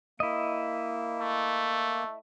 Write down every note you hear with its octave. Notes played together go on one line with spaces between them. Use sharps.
A#3 E4 D#5
A3